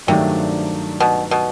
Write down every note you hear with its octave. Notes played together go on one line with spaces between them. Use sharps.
G2 C3 D#3 F#3 A3 D4
B2
B2